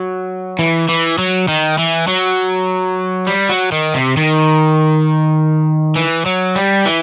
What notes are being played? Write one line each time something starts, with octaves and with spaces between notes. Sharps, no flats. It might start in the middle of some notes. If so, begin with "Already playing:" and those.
Already playing: F#3
E3
E3
F#3
D#3
E3
F#3
G3
F#3
D#3
C3
D#3
E3
F#3
G3
E3